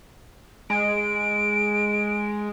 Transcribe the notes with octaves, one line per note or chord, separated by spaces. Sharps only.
G#3 D7